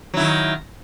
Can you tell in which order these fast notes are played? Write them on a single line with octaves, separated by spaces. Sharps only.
F#3 E4 D#3